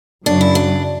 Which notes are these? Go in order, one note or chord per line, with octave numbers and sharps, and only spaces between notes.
F#2 C#3 F#3 D4
E4
D4